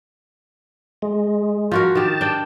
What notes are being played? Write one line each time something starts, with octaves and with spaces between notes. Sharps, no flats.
G#3
F3 F#4 A#4
D#3 G4 A5
D4 G5